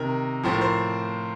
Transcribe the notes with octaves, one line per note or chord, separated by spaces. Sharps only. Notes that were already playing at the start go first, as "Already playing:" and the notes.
Already playing: C3 D#3 A#4
A2 F3 C5
A#4
C5